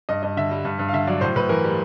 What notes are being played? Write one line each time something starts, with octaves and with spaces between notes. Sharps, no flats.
G2 D#5
G2 D#5
D3 E5
G3
G2
G2
F5
D3 E5
F#3 D5
A2 C5
A2 B4
E3 A#4
G3